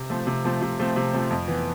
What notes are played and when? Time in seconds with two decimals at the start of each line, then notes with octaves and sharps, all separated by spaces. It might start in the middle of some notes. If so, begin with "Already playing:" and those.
Already playing: C3
0.10 F3 A3 C4
0.27 C3
0.44 F3 A3 C4
0.62 C3
0.79 F3 A3 C4
0.96 C3
1.13 F3 A3 C4
1.30 F2
1.48 E3 B3